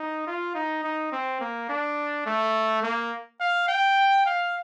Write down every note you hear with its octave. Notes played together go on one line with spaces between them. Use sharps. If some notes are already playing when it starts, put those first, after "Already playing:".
Already playing: D#4
F4
D#4
D#4
C4
A#3
D4
A3
A#3
F5
G5
F5